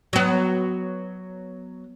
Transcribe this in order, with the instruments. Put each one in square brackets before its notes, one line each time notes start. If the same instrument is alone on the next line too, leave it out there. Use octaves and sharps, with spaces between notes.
[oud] F#3 B3